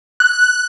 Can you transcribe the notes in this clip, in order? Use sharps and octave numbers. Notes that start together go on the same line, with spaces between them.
F#6